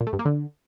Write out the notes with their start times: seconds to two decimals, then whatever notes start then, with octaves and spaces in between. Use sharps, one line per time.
0.01 A#2
0.07 A3
0.13 G2
0.19 A#3
0.25 D3